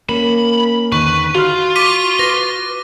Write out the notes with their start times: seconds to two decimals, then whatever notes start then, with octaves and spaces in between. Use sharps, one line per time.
0.09 A#3 C#4 A#4 B5
0.92 E2 D3 D#3 B4 C#6
1.35 F4 F#4 F5 F6
1.76 D6 B6 D#7
2.19 B4 A#6